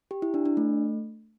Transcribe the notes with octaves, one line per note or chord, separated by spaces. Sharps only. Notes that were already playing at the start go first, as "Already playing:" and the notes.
G4
E4
D4
D4
A3